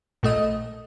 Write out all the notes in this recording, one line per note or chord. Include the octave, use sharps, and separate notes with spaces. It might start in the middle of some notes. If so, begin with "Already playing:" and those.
A#1 A3 D#5